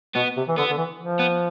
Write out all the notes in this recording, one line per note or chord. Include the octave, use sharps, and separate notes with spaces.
B2 B3
C3
E3
D3 B3
D3
E3
F3
B3